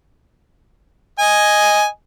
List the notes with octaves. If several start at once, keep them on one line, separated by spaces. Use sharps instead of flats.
D#5 G#5